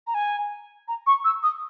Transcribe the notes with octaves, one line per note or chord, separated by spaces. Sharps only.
A#5
G#5
A#5
C#6
E6
D#6